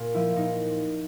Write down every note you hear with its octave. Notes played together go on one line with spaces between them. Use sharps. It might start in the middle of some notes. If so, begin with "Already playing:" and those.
Already playing: A#2
F3 E4
A#2 D#4